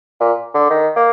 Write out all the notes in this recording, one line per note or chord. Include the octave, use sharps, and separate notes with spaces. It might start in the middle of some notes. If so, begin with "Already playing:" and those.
A#2
D3
D#3
A#3